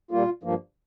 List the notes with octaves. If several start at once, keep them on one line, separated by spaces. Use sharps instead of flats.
A#2 G3 A#3 F4
G2 F3 A#3